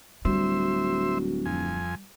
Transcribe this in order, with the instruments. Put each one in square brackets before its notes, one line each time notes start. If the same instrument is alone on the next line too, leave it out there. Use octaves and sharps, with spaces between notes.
[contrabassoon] D1 [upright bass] G3 [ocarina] F#4 [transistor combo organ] C5 E5
[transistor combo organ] F2 G#5